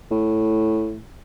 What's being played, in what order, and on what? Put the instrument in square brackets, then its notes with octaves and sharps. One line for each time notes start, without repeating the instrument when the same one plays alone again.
[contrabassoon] A2